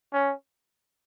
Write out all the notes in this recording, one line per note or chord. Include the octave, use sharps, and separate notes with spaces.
C#4